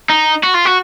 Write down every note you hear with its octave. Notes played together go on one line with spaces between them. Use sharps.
D#4
F#4
F4
F#4